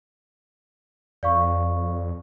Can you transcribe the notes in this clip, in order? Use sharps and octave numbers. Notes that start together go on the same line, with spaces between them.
F2 D5 F5 C#6